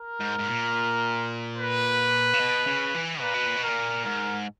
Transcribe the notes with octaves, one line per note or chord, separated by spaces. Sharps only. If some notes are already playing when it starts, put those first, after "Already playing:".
Already playing: A#4
G#2
G#2
A#2
B4
C#3
B2
C#3
E3
A#2 B4
B2
A#2
B2
A#4
A#2
G#2 A#4